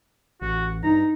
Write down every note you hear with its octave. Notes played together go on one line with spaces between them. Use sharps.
A1 F#4
G2 D#4 A#5